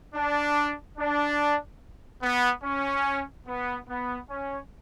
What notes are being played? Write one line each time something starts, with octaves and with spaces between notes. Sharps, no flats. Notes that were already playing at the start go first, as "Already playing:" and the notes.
D4
D4
B3
C#4
B3
B3
C#4